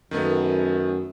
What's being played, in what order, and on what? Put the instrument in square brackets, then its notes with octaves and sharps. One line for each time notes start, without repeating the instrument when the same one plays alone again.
[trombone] F#2 [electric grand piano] D#3 A3 B3